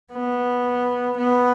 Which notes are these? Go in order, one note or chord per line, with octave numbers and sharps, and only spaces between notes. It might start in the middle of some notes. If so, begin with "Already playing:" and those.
B3
B3